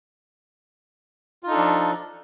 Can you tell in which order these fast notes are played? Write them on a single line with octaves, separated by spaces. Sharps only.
F4 D#4 A4 D4 F3